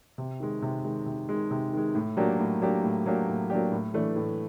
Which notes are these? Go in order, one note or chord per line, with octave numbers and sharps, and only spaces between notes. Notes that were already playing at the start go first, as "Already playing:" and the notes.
C3
D#3 G#3
C3
D#3 G#3
C3
D#3 G#3
C3
D#3 G#3
A2
F#3 A#3 D4 G4
A2
F#3 A#3 D4 G4
A2
F#3 A#3 D4 G4
A2
F#3 A#3 D4 G4
A2
E3 A3 D4
A2